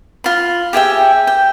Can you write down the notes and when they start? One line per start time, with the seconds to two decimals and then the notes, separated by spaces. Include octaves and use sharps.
0.24 F4 B5
0.73 G4 G#4 E5 G5
1.27 G5